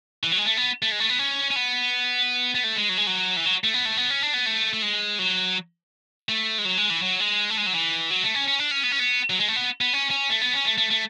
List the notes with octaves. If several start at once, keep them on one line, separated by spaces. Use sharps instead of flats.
E3
F#3
G#3
A3
B3
A3
G#3
A3
B3
C#4
C#4
B3
B3
A3
G#3
F#3
G#3
F#3
E3
F#3
A3
B3
A3
B3
C#4
D4
B3
A3
A3
G#3
F#3
A3
G#3
F#3
G#3
E3
F#3
G#3
A3
G#3
F#3
E3
F#3
A3
C#4
C#4
D4
C#4
B3
C#4
B3
F#3
G#3
A3
B3
B3
C#4
C#4
A3
B3
C#4
A3
A3
A3